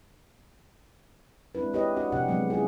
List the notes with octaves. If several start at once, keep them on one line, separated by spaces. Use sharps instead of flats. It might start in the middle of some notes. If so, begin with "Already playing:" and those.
G#3 C4 D4 E4 B4
E4 G4 B4 C#5 D#5
D4 F#4 F#5
C3 F3 D4 G4 F#5
F#3 G#3 B3 C4
C#4 E4 F4 G#4